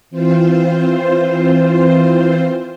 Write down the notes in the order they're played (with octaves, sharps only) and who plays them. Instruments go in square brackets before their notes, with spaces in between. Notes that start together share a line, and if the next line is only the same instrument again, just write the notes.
[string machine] E3 C4 F4 C5